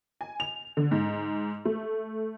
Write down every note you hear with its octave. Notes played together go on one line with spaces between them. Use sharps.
G#5
F7
D3
G#2
A3